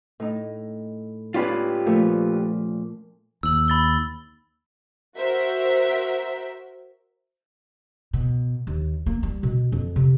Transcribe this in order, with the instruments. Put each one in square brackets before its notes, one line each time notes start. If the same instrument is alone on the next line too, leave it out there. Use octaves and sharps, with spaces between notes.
[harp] A2 D#4
[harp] C#4 D5 B5 [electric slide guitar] F4 G4 B4
[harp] A#2 F3 A3
[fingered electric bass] D#2 [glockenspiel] E6 F#7
[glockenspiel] B5 A6 G7
[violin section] F#4 A#4 C5 E5
[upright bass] B2
D#2
A#3
G3
B2
F2
C3